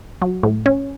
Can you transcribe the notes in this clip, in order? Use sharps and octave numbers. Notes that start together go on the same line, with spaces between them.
F#3
A2
C#4